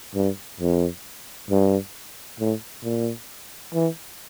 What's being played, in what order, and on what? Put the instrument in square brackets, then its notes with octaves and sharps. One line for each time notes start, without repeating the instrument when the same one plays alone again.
[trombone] G2
F2
G2
A2
A#2
E3